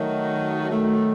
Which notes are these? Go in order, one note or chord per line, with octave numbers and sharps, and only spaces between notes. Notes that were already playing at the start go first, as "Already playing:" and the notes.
Already playing: D#3 F#3 A3 D#4 F#4
D#3 F#3 A3